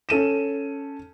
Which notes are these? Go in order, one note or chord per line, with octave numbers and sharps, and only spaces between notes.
C#4 A4 D#7 E7